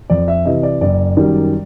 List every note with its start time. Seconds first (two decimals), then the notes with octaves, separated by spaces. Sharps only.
0.10 F2 D5
0.28 E5
0.45 C3 E3 D#5
0.63 D5
0.81 F#1 D5
1.17 F#2 D#3 G3